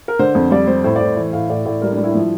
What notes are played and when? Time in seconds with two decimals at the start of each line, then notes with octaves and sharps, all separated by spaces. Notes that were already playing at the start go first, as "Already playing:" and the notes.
0.08 A#4
0.19 D3 C5
0.35 F2
0.51 G3 D5
0.67 G3 C5
0.84 A2 C5
0.96 D5
1.01 A2 C5
1.17 E3 C5
1.33 A2 F5
1.49 A2 D5
1.65 A2 D5
1.81 G3 A#4
1.92 D4
1.98 G3
2.04 E4
2.15 F3 E4